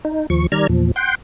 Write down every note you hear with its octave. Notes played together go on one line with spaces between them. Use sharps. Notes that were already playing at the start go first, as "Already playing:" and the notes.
D#4
D#2 F3 C#6
D#3 G3 D5 A#5 F6 G#6
E2 A#2 F3
F#5 G5 C6